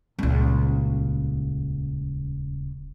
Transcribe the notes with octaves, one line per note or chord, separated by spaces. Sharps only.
D#1 C#2